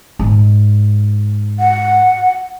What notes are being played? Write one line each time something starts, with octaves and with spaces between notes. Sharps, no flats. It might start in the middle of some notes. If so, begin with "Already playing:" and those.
G#2
F#5